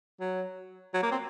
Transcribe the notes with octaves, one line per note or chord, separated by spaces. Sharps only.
F#3
F#3
A#3
C4